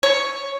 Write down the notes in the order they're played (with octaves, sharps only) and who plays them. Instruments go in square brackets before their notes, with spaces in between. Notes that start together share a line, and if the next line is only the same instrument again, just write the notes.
[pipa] C#5